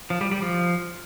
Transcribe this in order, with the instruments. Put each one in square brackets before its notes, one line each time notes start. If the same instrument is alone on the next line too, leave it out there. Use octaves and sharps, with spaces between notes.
[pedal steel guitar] F3
G3
G3
F3